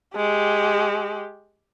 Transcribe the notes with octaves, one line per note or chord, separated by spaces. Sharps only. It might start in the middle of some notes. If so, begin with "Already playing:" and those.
G#3 G4